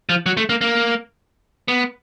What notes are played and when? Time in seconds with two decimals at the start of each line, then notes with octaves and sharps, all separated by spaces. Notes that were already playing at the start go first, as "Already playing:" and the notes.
0.09 F3
0.26 F#3
0.37 A3
0.49 A#3
0.61 A#3
1.68 B3